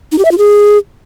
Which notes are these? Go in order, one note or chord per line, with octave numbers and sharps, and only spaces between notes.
D#4
G4
E5
F4
G#4